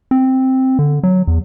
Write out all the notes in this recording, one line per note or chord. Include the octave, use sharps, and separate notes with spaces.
C4
D3
F#3
E2